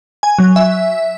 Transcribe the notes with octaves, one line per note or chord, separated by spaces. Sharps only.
G#5
F#3
E5